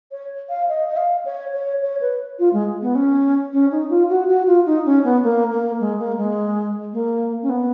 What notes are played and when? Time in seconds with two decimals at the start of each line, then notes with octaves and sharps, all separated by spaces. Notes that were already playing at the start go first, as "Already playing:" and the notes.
0.12 C#5
0.49 F5
0.69 D#5
0.88 D#5
0.97 F5
1.25 C#5
1.54 C#5
1.82 C#5
2.01 B4
2.39 F4
2.53 G#3
2.82 B3
2.95 C#4
3.53 C#4
3.71 D#4
3.90 F4
4.09 F#4
4.29 F#4
4.47 F4
4.66 D#4
4.85 C#4
5.04 B3
5.23 A#3
5.51 A#3
5.80 G#3
5.99 A#3
6.17 G#3
6.93 A#3
7.42 C#4
7.50 B3